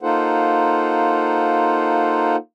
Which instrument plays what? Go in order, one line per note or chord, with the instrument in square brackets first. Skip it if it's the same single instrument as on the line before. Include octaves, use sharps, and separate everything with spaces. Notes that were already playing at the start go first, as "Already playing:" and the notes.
[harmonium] A#3 D#4 F4 A4 C5 F#5